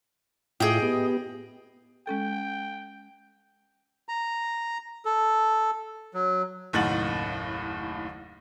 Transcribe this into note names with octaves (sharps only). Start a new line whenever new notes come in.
A2 E4 F4 G#4 D#5 G5
B3 G4
G#3 C#4 A4 G5
A#5
A4
F#3
F#1 D#2 A2 F#5 A6 F#7